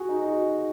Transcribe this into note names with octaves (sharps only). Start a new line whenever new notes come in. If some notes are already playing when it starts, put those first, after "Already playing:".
Already playing: F#4 G#4
D#4
D#4
F#4